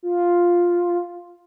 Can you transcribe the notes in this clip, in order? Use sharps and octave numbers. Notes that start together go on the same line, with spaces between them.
F4